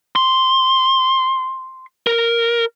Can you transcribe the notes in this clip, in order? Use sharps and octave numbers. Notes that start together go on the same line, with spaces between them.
C6
A#4